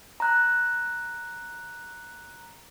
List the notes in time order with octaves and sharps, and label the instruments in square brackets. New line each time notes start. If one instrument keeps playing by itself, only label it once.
[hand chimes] A#5 F#6